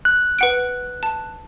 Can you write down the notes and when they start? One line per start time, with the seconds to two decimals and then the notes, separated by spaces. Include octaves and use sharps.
0.05 F#6
0.39 B4 F#5 D7
1.03 A5